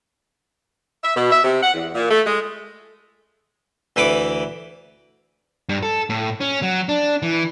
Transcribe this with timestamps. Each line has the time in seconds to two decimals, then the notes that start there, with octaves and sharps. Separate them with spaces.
1.02 E5
1.15 B2
1.29 E5
1.44 C3
1.61 F#5
1.74 E2
1.95 A#2
2.10 A3
2.25 G#3
3.96 D2 E3 B4 B5 D6
5.69 G2
5.83 A4
6.10 A2
6.40 C#4
6.62 F#3
6.89 D4
7.22 E3